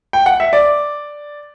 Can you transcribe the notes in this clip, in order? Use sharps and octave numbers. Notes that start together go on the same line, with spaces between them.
G5
F#5
E5
D5